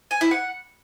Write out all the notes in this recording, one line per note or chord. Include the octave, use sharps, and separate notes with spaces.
G#5
E4
F#5